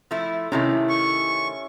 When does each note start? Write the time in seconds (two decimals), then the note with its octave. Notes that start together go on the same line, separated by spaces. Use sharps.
0.11 F3 A3 E4
0.52 C3 D#3 A3 C#4 E4
0.89 C#6